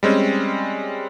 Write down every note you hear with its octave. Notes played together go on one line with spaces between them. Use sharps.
G3 G#3 C4 C#4